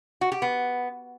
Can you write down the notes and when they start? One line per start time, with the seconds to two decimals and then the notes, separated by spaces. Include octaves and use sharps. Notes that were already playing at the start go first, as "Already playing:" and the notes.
0.21 F#4
0.32 G4
0.42 B3